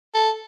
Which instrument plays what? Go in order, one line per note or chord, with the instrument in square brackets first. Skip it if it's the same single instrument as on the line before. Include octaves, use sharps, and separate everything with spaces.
[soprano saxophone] A4